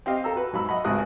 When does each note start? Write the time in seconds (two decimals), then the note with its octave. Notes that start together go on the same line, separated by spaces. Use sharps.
0.06 C4 G4 D#5 F5
0.24 A4 A#5 E6
0.36 F#4 B4
0.53 G#2 F#3 F5 B5 E6
0.69 D#5 F#5 B5
0.84 G#1 C#2 A2 G#4 D#6 F#6